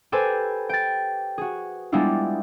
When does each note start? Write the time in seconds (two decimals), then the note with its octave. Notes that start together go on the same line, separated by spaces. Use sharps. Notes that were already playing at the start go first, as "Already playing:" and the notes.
0.12 G4 A4 B4 C5 G#5
0.69 G5 A6
1.38 F#4 G#4
1.92 G3 G#3 B3 D4 E4 F4